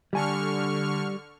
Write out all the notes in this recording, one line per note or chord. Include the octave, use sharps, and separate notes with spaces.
D3 G3 G#5 A5 C#6 F6